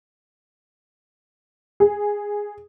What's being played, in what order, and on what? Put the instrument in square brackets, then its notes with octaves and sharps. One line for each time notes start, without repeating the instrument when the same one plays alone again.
[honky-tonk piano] G#4